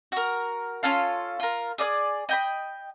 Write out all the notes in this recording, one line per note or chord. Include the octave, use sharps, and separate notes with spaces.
F#4 A#4
C#4 F4 A4 F5
F4 A#4
G#4 D5 F5 G#5
D#5 G5 B5